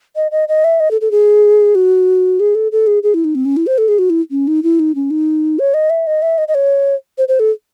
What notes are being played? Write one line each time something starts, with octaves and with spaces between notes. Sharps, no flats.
D#5
D#5
D#5
E5
D#5
A4
A4
G#4
F#4
G#4
A4
A4
G#4
G#4
E4
D#4
C4
C#4
E4
C5
A4
G#4
F#4
E4
C#4
D#4
E4
D#4
C#4
D#4
C#5
D#5
E5
D#5
E5
D#5
D#5
C#5
C5
C5
A4